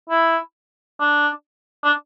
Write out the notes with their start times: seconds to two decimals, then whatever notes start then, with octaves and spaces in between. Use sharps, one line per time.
0.09 E4
1.00 D4
1.84 D4